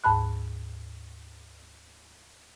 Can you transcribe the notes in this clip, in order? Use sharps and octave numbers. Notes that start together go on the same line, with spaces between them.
D2 G#2 A5 B5 F#6